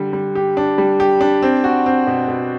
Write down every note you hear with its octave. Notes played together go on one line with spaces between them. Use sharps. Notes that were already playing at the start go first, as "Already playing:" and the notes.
Already playing: D3 G3
G3
G4
D4
G3
G4
D4
C4
F#4
C4
B2
B2